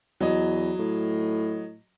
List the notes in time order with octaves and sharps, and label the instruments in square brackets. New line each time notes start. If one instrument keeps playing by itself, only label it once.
[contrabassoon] E2 [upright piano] F#3 D#5
[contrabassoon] A2